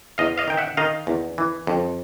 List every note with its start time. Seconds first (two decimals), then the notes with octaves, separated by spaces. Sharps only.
0.18 E2 D#5 F5
0.38 D#5 F5
0.48 D#3 G5
0.57 E5 F#5
0.77 D#3 D#5 F5
1.07 E2
1.38 E3
1.67 F2